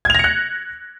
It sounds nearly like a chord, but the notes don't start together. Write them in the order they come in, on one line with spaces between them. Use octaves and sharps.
G#6 F7 A#6 C#7 F#6